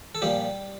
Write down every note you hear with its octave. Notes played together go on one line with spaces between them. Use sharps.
A4
A#2 F3 G3 G4